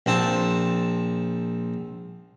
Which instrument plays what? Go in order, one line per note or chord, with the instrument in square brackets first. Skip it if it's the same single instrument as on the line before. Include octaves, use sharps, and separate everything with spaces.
[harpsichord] A#1 C4 A5